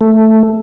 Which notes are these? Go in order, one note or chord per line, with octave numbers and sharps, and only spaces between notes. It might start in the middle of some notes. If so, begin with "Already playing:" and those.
A3